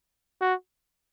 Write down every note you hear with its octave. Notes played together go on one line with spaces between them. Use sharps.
F#4